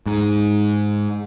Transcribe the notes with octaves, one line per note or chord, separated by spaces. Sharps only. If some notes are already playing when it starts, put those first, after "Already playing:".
G#2